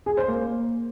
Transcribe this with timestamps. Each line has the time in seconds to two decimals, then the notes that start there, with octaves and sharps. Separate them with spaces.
0.06 G#4
0.17 C5
0.28 A#3